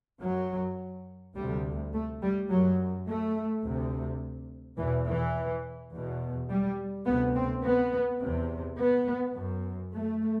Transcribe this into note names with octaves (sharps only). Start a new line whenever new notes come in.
F#2 F#3
D2 C3 G3
A3
G3
F#2 F#3
A3
D2 C3
E2 B2 E3
E3
E2 B2
G3
D2 C3 B3
C4
B3
E2 C3
B3
F#2
A3